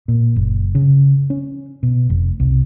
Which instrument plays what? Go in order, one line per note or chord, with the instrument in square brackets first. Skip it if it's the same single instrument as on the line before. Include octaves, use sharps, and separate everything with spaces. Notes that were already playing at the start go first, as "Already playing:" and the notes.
[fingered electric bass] A#2
F#1
C#3
C#4
B2
F1
C2